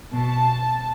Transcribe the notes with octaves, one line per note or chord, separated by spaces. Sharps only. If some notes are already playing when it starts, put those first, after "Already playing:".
B2 A5